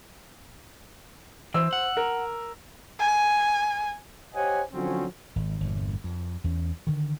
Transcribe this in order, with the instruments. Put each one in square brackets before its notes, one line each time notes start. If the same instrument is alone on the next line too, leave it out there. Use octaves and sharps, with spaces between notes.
[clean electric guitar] E3 [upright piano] C5 E6
[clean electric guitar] F#5
[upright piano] A#4
[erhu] G#5
[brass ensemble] G4 C5 C#5 D#5 F#5 G#5
D3 F3 F#3 C4 C#4
[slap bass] G#1
G1 E2 A#2
F2
E2 C#4
D3 D#3